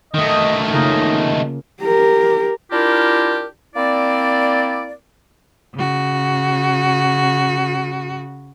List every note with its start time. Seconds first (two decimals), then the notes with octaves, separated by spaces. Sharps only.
0.14 D#3 A3 D#5
0.72 C#3 A#3 D#4 F4
1.83 G4 A#4
2.72 D4 E4 F4 G4 A#4
3.75 A#3 C4 E4 D5
5.75 C#3 F#4